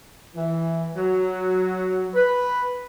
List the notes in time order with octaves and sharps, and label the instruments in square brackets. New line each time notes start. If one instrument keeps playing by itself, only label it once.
[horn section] E3
F#3
B4